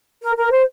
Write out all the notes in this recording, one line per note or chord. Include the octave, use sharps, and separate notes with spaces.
A#4
A#4
C5